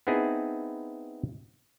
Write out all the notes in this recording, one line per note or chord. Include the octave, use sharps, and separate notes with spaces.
B3 C4 D#4 E4 G#4